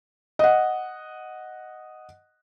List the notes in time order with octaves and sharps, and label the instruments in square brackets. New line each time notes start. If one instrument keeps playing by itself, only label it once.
[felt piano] D#5 F#5